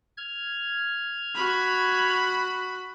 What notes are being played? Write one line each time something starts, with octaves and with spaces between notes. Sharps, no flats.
F6 G#6
F#4 B5